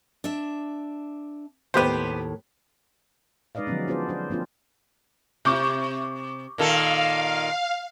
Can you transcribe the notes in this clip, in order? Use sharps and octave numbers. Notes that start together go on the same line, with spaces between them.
D4 E5
D#2 A2 B3 G4 C5
G#3 D#4 B4 D5 D#5 F5
D3 F3 F#3 G#3 B3 C#4
B3 D4 F4 G#4 C5 D5
D4 C5
F3 A#3 C4 D4 F4
C3 C#6 D6 G6
A#2 D#3 A4 F5